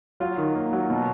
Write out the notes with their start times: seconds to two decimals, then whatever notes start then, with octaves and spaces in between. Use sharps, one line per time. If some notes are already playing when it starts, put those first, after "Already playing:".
0.20 F#3 F4
0.38 D#3
0.55 A#3
0.73 F#3
0.90 B2